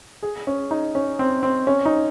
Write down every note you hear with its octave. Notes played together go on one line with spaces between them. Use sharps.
G#4
C#4
D#4
C#4
C4
C4
C#4
D#4